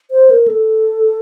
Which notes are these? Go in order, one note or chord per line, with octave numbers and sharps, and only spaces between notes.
C5
A#4
A4